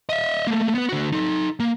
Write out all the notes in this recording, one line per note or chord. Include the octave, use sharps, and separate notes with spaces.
D#5 E5
A3 A#3
B3 B4
D3 F#4
D#4 A4
A#3